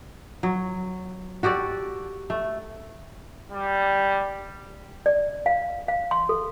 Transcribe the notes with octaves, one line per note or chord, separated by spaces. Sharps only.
F#3
F#4 G4 A4 D5
A3
G3
D5
F5
F5
C6
A4